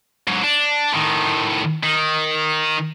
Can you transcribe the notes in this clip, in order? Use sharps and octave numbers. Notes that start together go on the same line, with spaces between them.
G#2 F#3
D4
A2 D#3
D#3